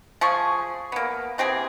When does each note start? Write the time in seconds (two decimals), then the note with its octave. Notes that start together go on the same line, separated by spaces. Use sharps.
0.21 F3 G#4 C#6
0.92 A#3 B3
1.38 E3 C4 G4 G#4